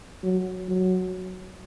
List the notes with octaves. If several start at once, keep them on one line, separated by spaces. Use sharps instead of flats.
F#3
F#3